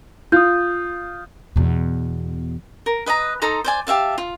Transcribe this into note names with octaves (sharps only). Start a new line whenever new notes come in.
F4 D#6 G6
E2 B2
A#4
B4 D#5 A5 A#5
D#4 A4 A#5 C6
C5 D5 G#5
G4 E5 F5 A5
F4